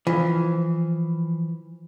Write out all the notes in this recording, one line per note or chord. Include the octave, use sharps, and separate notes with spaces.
E3 F3